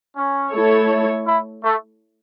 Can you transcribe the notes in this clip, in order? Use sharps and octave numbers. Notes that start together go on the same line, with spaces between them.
C#4
A3 E4 A4 C#5
E4
A3